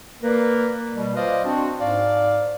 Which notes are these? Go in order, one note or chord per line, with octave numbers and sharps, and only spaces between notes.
A#3 A#4 B4 D5
B2 G3
F4 B4 C5 D5 D#5 F5
C4 D4 F#4
G#2 D5 F5